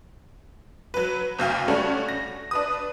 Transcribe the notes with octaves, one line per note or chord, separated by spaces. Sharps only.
F#3 B4
F#1 D2 F5 G5
G3 A3 C#4 D4 F#4
A#6
D4 B4 D#6